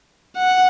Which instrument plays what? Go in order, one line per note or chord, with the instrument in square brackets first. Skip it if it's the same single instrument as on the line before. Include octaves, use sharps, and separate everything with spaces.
[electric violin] F#5